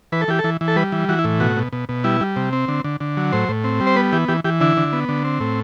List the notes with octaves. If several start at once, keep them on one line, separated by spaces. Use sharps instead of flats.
E3 B4
A4
E3 G4
A4
E3
E3
A4
G3 B4
E3
E3 F#4
E4
A2
B2 F#4
B2
B2
B2
G3 E4
G3
C3
C4
D3
D3
D3
F#3
A2 C5
A2
C4
G3
C5
B3 B4
E3 G4
E3 G4
E3 G4
D3 E4
D3
B3
D3
C4
A2